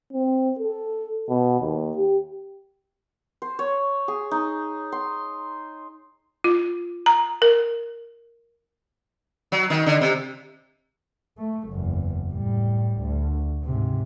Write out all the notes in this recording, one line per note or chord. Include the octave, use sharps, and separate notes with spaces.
C4
A4
B2
D#2
G4
C5
C#5
G#4
D#4
C6
F4
A#5
A#4
F#3
D#3
D3
C3
A3
F#1 E2
A2 G3
D2
G#2 C3